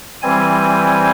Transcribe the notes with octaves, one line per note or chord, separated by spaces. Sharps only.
E3 G3 C4 G#5